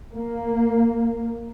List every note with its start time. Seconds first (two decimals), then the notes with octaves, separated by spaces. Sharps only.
0.15 A#3